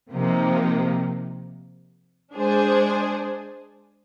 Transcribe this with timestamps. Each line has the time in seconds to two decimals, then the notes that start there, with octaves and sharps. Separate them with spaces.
0.10 C3 F3 A#3 D#4
2.34 G#3 D4 G#4 C5